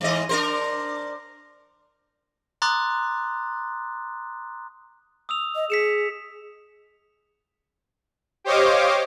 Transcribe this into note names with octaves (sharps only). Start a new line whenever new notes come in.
G#2 E3 D#5
D4 A#4 C5
A#5 C6 D6 D#6 F#6 A6
D#6 E6 F7
D#5
G#4 B6 C#7 E7
G4 C5 C#5 D#5 F5 D6